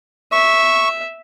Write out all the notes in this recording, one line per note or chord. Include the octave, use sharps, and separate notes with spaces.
E5 C#6